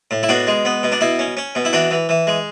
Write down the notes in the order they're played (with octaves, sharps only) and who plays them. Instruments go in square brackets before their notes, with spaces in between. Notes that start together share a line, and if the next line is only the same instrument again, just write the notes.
[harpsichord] A2
E4
B2 D4 F#4
G#3
B3
B2
D4
B2 E4
C#4
C#4
B2
E4
E3 D4 F#4
E3
E3
G#3